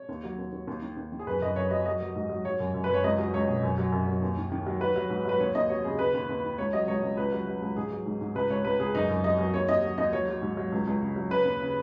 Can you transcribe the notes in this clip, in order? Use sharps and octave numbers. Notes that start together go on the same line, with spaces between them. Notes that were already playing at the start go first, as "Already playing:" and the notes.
Already playing: C#5
D#2
F#3
D#2
D#2
D#2
D#3
D#2
D#3
G#4
F#2 B4
F#2 D#5
F#2 C#5
F#3 D#5
F#3 D#5
F#3
G#2
F#3
F#3 C#5
F#2
F#2
B4
F#2 C#5
C#2 D#5
F#3
C#2 C#5
B2
F#2
F#3
F#2
F#2
D#2
D#3
D#3
F#3
F#3 B4
F#3
G#2
F#3 B4
D#2 C#5
D#2 D#5
F#3 C#5
C#3 G#4
D#2 B4
D#2
D#2
D#3
C#2 C#5
F#3 D#5
C#2 C#5
C#2
C#2 B4
F#3
F#3
C#2
G#2 G#4
F#3
G#2
G#2
C#2 B4
C#2 C#5
C#2 B4
C#2 G#4
F#2 D#4
F#2
F#3 D#5
F#3
D#2 C#5
D#2 D#5
F#3
D#2 D#5
F#3 C#5
F#3
G#2
F#3
C#2
C#2
C#3
F#3
C#3 B4
D#2
C#3